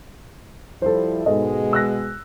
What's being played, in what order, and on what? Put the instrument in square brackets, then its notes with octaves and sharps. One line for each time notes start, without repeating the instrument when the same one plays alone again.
[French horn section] F3 G3 E4 [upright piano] A4 C5
[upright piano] G#2 A4 D#5 [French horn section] B2 G#3
[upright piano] E6 F#6 A#6